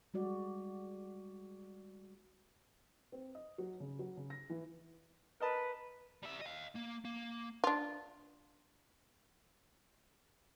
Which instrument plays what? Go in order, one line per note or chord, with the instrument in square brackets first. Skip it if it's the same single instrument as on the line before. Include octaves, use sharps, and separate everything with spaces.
[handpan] G3 G#3 F#4 D5
[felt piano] C4
D#5
F#3
C#3
F#3
C#3
A#6
E3
[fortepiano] A#4 D#5 A5 [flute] B4
[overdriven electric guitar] G3 E5
D#5 F5
A#3
A#3
[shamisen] D4 F4